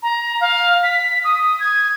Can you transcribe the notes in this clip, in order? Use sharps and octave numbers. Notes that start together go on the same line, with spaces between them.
A#5
F5
B6
D#6
G#6